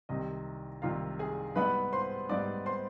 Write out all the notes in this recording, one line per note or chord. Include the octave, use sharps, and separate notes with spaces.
C2 C3 D#3 D#4 D#5
C2 C3 D#3 F4 F5
G#4 G#5
G#2 G3 B3 B4 B5
C5 C6
G#2 G3 B3 D5 D6
C5 C6